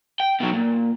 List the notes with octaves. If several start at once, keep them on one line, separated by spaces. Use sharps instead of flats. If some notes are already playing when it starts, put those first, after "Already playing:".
G5
B2 F#3
A#2